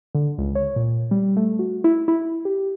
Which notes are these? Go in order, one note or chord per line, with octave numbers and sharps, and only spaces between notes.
D3
C#2
C#5
A#2
G3
A3
F#4
E4
E4
G4